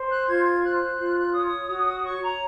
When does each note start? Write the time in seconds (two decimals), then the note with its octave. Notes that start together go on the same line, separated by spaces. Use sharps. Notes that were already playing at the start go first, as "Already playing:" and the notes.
Already playing: C5
0.10 F#6
0.27 F4 G#6
0.45 G#6
0.63 C5 F#6
0.98 F4
1.33 C#5 D#6
1.69 F#4
2.04 C#5 C#6
2.22 A#5